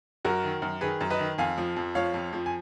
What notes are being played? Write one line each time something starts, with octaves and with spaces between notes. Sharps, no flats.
F#2 F#4 A#4
D#3
F#2
D#3 G#4 B4
F#2
B4 D#5
D#3
F2 F5 G#5
F3
F2
F3 C#5 F5
F2
F3
G#5